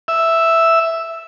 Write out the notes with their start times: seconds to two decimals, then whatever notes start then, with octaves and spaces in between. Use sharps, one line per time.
0.08 E5